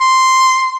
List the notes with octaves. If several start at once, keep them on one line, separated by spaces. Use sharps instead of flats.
C6